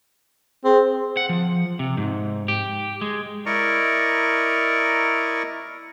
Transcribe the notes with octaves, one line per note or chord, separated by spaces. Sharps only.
C4 G#4
F#5
F3
C3
G#2
G4
G#3
E4 A#4 D5 D#5 A#5 C#6